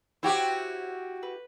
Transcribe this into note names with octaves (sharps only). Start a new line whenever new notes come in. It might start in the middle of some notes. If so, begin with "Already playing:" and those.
E4 F#4 G4 C5 C#5 G5
B4